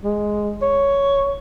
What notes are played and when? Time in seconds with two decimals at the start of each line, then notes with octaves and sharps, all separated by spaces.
0.04 G#3
0.62 C#5